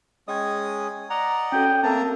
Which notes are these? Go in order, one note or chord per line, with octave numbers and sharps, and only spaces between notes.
G#3 C#4 D#5 G5 D#6 G#6
D5 D#5 F#5 A#5
C#4 F#4 A4 G5
A3 A#3 C4 A#4 A5 A#5 E6